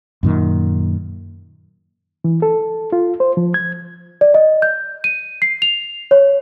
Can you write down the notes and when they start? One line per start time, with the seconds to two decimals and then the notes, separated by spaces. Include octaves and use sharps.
0.23 F#2 A#2 D#3
2.24 E3
2.42 A4
2.92 F4
3.20 C5
3.37 F3
3.54 G#6
4.21 D5
4.34 D#5
4.62 G6
5.04 D#7
5.42 C7
5.62 F7
6.11 C#5